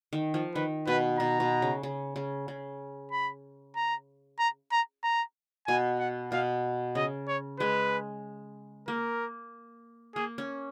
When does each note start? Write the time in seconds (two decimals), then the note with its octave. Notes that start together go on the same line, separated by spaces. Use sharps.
0.13 D#3
0.34 F3
0.55 D#3 B4
0.87 B2 B4
1.19 B2 A#5
1.40 B2
1.62 C#3
1.83 C#3
2.16 C#3
2.48 C#3
3.12 B5
3.76 A#5
4.39 A#5
4.72 A#5
5.03 A#5
5.67 B2 G#5
6.00 F#5
6.32 B2 F5
6.95 C#3 D#5
7.28 C#5
7.60 G#3 B4
8.88 A#3 A#4
10.16 A#3 G#4
10.38 C#4